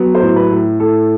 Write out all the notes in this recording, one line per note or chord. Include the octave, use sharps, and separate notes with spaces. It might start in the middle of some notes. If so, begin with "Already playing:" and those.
Already playing: F#3 B3
C5
A2
B4
A2
A2 A4